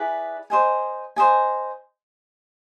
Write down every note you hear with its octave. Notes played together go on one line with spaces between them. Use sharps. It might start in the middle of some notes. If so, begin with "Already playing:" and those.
Already playing: E4 G#4 B4 D5
C5 D#5 G#5
C5 D#5 G#5